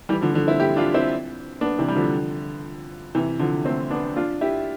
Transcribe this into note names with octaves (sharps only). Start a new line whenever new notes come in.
E3 G3
D3 F3
D3 F3
C4 E4
E4 G4
D4 F4
C4 E4
B3 D4
C3 E3
G3
D3 F3
C3 E3
D3 F3
A3 C4
B3 D4
D4 F4
E4 G4